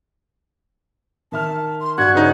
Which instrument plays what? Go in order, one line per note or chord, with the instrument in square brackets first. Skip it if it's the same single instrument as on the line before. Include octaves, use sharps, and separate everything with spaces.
[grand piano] D#3 E5 F6 [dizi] A5
[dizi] C6
[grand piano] G2 F#6 [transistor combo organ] F#4 [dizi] G#6
[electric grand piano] C#3 D#4 [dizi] B4